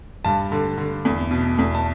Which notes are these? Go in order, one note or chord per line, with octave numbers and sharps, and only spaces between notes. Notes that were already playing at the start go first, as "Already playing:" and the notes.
G2 A5
D3
D3
E2
B2
E2
A5